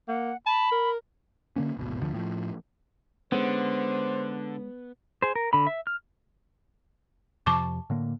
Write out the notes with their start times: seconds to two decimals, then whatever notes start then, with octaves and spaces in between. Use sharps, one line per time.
0.08 A#3 F#5
0.46 A5 B5
0.72 A#4
1.56 D3 A#3 C#4
1.77 D1 G#1 B2
2.00 F1 D2 D3 F3
2.14 A2 F3
3.32 D3 G#3 B3 C#4 C5
5.22 G#4 C5
5.35 A#4
5.53 D3 B5
5.67 E5
5.87 F6
7.46 F2 C3 F3 A5 C#6 D6
7.90 A2 D3 A#3